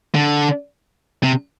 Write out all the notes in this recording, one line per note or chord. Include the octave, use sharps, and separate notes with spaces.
D3
C3